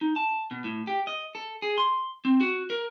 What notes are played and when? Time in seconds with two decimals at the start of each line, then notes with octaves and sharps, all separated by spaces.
0.01 D#4
0.16 A5
0.51 B2
0.64 A2
0.87 G4
1.07 D#5
1.35 A4
1.62 G#4
1.78 C6
2.25 C4
2.40 F#4
2.70 A#4